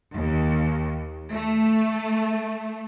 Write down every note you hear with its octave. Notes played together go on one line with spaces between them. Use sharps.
D#2
A3